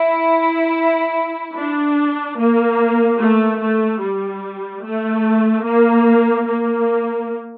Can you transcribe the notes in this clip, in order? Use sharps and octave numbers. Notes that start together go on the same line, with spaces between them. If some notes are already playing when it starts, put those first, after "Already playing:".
Already playing: E4
D4
A#3
A3
A3
G3
A3
A#3
A#3